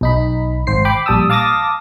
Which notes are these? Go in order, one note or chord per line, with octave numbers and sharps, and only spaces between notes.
B1 D#4 B5
G#1 C5 C7
G5 B5 D6
A#1 G3 A5 D#6 E6
F5 A5 D6 D#6 A6 A#6